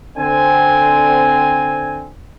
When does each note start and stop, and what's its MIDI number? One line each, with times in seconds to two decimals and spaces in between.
0.18 2.10 50
0.18 2.10 60
0.18 2.10 80